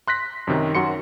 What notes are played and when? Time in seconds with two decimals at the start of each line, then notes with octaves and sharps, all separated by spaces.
0.08 C6 F#6 A#6 B6
0.47 F#2 C3 D#3
0.75 F#2 F#4 C6 C#7